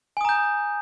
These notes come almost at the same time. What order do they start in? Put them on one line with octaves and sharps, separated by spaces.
G#5 D#6 A#5 G6